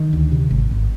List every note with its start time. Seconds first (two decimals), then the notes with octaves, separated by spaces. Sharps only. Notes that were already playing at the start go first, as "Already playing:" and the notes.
Already playing: D#3
0.13 D2
0.32 C3
0.51 G#1
0.71 G#1